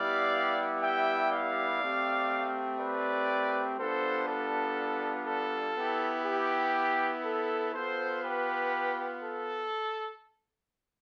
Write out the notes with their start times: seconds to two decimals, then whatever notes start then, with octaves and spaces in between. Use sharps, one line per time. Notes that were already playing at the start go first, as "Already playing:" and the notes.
Already playing: G3 B3 E4 G4 D5 F5
0.82 E5 G5
1.31 D5 F5
1.81 A3 C4 G4
2.79 B4 D5
3.78 G3 B3 D4 F4 A4 C5
4.28 A4
5.26 A4
5.75 B3 E4 G4
6.25 G4
7.24 A4
7.74 B3 F4 A4 C5
8.22 G4 B4
9.22 A4